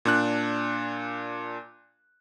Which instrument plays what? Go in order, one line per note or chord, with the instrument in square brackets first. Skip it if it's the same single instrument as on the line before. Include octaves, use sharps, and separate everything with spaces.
[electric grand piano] A#2 D4 F#6